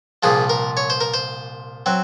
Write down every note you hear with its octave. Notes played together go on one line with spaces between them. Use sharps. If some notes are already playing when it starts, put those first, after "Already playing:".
C2 A#2 F3 G#4
A#4
C#5
C5
A#4
C5
F#3 C4